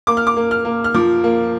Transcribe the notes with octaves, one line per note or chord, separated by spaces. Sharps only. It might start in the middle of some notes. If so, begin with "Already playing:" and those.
A#3 D6
F6
D6
A#3
F6
A#3
F6
F3 D6
A#3